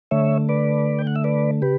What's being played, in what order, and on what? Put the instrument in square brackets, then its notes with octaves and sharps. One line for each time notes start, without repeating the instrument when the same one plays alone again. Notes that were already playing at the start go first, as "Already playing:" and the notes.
[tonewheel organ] D3 A3 C#5 E5
B4 D5
G5
F#5
E5
B4 D5
C#3 G4 B4